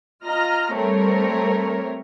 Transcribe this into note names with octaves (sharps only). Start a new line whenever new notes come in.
F4 D#5 A#5 F6
G3 A3 C4 A#4 C#5